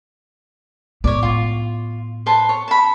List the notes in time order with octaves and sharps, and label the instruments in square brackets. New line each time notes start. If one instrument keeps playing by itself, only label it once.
[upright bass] A2 B3 [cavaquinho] C#5 D5
[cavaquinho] F4
B4 C5 A5
C#5
A5 B5